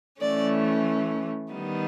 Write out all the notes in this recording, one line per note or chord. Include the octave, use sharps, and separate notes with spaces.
E3 A3 C#4 D5
D#3 G3 B3 D#4